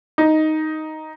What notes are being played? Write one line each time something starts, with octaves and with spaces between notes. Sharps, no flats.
D#4